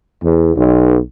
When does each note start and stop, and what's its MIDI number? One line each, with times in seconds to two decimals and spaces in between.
0.24 0.56 40
0.56 0.98 35